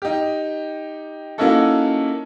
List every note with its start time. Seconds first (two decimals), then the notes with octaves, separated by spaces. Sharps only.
0.02 D#4 G4
1.38 A#3 C#4 D#4 E4 F#4 A4